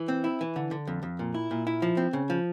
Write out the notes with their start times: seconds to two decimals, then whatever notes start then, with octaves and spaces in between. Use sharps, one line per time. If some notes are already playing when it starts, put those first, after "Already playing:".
Already playing: E3
0.08 C4
0.24 E4
0.41 E3
0.56 D3
0.71 D3
0.87 F2
1.03 F2
1.19 A#2
1.34 E4
1.51 A#2
1.67 E4
1.82 F3
1.97 C4
2.13 C#3
2.30 F3